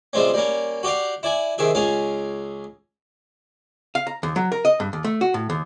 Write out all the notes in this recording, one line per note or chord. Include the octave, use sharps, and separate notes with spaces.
C3 F3 G3 G#3 C4 C#4
G3 A#3 C#4
F#4 G4 D5 F5
E4 D5 G#5
C3 D#3 G#4 E5
C#2 C#4 G#4 F5
F5
A#5
D#2
F#3
A#4
D#5
G2
D#2
A3
F#4
A2
D#2